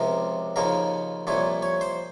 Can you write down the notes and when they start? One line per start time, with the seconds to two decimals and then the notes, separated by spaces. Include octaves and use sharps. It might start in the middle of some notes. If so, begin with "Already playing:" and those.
Already playing: C#2 C3 F3 A#4
0.56 D#2 C#3 F3 A#4
1.27 C2 A#2 F3 C#5
1.62 C#5
1.81 C5